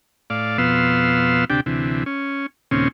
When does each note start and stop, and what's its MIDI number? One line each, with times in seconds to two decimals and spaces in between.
0.30 0.58 45
0.30 0.58 74
0.30 0.58 77
0.58 1.45 41
0.58 1.45 47
0.58 1.45 59
0.58 1.45 77
0.58 1.45 84
0.58 1.45 88
1.50 1.60 38
1.50 1.60 48
1.50 1.60 62
1.50 1.60 67
1.50 1.60 79
1.66 2.04 38
1.66 2.04 48
1.66 2.04 52
2.06 2.46 61
2.71 2.88 39
2.71 2.88 46
2.71 2.88 49
2.71 2.88 60
2.71 2.88 61